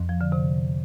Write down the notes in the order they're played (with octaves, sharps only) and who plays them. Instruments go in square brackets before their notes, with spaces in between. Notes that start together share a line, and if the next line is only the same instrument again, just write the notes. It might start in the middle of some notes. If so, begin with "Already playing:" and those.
Already playing: [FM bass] F2
[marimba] F3
D3
C3